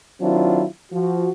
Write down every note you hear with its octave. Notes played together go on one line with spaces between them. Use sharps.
D#3 F#3 C4 D4 E4 F4
F3 F#4